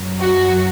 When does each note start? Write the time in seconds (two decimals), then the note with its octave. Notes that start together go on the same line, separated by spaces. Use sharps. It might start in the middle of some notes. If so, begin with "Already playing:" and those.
Already playing: F#2 F#3
0.21 F#4